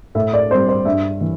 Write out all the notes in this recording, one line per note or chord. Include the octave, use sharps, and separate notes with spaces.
A2 E5
D5
G3 C4 C5
C5
G2 E5
E3